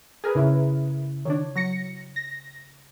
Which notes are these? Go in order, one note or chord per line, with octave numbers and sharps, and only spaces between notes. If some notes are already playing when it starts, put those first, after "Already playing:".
G#4 A#4 B4
C#3 E4
D#3 D4 C#5
F#3 A#6 C#7
A#6